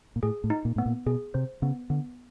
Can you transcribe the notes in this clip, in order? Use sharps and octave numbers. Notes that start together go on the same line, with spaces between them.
A#2
A2 G#4
A2
D#4
A#2
A2 B3
A#2
B2 G#4
C3 C5
C#3 B3
D3 B3